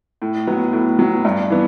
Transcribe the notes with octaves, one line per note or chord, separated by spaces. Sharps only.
A2
F#3 B3
A2
F#3 B3
G2
E3 B3